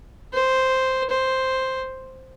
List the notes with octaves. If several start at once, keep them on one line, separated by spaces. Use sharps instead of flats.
C5
C5